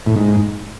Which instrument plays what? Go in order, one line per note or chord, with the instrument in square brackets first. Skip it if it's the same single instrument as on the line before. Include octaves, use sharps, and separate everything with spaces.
[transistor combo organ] A2
G#2